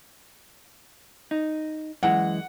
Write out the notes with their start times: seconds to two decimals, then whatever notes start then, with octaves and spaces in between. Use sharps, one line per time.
1.31 D#4
2.03 F#2 E3 G#3 F#5